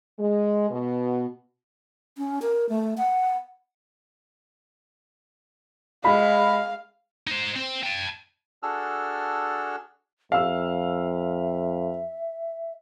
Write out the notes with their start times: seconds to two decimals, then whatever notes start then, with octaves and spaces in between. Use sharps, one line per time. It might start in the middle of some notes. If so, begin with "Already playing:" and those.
0.18 G#3
0.71 B2
2.17 C#4
2.42 A#4
2.69 A3
2.98 F#5
6.05 G#3 F5 B5
7.27 D#4 C5
7.56 C4
7.84 G5 A5
8.63 D4 F#4 G#4 A4 E6 F6
10.32 F2 E5 F5 E6